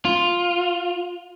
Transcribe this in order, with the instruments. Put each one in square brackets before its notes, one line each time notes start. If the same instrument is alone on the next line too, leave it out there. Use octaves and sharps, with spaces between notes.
[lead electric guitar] F4